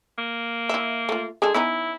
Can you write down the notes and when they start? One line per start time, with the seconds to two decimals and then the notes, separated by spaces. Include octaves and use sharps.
0.18 A#3
0.69 E4 E5
1.09 A3 F4
1.42 G#3 D4 G#4 A4
1.54 B3 C#4 D#4 E4